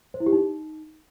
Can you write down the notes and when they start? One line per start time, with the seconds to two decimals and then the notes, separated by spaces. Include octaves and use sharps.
0.14 C5
0.20 E4
0.26 G4
0.33 D#4